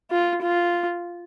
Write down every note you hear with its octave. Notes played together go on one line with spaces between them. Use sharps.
F4
F4